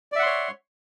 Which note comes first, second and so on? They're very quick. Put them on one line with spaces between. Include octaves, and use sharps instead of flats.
D5 E5 F#5 C6 C#5